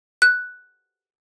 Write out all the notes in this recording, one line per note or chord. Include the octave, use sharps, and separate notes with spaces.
F#6